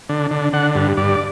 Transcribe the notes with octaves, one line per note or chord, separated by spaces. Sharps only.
D3
D3
D3 F#5
G2
G2 D5